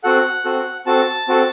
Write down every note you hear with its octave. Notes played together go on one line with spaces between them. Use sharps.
C4 F#4 A4 F#5
C4 F#4 A4
C4 F#4 A4 A5
C4 F#4 A4